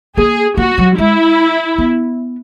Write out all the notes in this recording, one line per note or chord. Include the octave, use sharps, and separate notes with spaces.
A#3 G#4
A#3 F#4
F#3
G#3 E4
B3